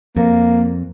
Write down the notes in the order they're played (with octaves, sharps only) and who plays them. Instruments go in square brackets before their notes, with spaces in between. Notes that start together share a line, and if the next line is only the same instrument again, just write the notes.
[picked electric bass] F2 [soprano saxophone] A#3